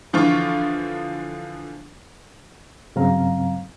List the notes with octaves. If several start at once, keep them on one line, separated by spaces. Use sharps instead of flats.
D3 E3 F3 F4 C#6
G2 C#3 F#3 C4 F5 A#5